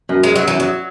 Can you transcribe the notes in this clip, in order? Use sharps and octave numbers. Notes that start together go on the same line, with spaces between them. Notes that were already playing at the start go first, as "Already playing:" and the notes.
F#2
F#2 G#3
F#2 F#3
E3
F#2
F#3